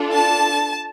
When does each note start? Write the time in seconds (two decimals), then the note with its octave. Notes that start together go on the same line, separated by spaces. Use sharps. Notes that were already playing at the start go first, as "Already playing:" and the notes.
Already playing: D4 F4 A4
0.12 A5